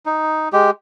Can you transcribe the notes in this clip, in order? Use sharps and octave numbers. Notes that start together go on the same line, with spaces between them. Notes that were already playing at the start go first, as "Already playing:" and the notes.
D#4
G#3 G4